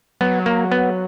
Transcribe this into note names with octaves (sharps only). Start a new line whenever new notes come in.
F#3 B3
A#3
B3